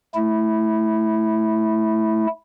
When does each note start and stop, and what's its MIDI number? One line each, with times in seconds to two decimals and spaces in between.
0.15 2.27 57
0.15 2.27 64